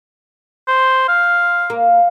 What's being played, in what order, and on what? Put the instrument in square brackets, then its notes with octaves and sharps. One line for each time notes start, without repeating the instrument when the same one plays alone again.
[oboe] C5
F5
[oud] A#3